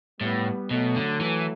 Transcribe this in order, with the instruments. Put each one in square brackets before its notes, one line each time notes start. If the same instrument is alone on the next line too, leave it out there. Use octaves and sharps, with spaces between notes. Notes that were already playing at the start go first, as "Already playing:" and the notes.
[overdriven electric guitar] A2 [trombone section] G3 B3
[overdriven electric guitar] B2 [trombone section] F#3 A3
[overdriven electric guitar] D3
E3